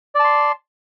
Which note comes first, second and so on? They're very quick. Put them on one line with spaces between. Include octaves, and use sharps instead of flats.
D5 A5 C6